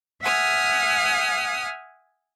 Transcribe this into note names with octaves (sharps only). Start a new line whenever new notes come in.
E5 F#5 G#5 D#6 F6